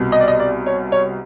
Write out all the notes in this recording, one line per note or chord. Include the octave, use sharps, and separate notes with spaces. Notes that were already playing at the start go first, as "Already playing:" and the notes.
Already playing: C2 B2
D#5
D5
D#5
D5
C#5
C#5